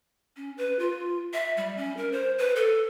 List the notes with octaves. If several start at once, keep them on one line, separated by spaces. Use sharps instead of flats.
C#4
B4
F4
E5
G3
C#4
A#4
C5
B4
A4